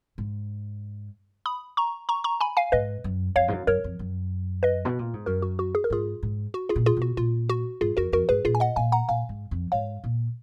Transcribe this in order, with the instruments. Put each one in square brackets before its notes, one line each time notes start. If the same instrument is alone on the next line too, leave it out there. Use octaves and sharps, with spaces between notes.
[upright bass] G#2
[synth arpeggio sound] B5 D#6
A#5 C#6
A#5 C#6
A#5 C#6
G#5 B5
F5 G#5
[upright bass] G#2 [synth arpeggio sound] B4 D#5
[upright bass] F#2
[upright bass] F2 [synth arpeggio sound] C#5 F5
[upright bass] G#2
F#2
[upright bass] F#2 [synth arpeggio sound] A#4 C#5
[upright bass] F2
F#2
[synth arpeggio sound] B4 D#5
[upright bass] B2
A#2
G#2
[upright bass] F#2 [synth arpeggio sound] F#4 A#4
[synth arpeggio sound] F#4
F#4
G#4
A#4
[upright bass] G#2 [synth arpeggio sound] F4 G#4
[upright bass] G#2
[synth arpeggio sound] F#4
F4 G#4
[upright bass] A#2
[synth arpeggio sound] F4 G#4
[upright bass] B2
[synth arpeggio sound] F#4
[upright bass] A#2 [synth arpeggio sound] F4
[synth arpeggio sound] F#4
[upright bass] G#2 [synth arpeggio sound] F4 G#4
[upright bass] F2 [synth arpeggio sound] F#4 A#4
[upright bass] F2 [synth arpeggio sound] F#4 A#4
[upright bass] G#2 [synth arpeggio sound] G#4 B4
[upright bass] A#2 [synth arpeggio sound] F4 G#4
[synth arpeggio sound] G#5
D#5 F#5
[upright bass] A#2 [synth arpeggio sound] F5 G#5
[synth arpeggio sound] F#5 A#5
[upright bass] A#2 [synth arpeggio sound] F5 G#5
[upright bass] G#2
F2
[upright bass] G#2 [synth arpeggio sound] C#5 F5
[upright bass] A#2